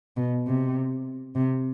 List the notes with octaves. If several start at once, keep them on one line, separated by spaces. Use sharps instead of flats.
B2
C3
C3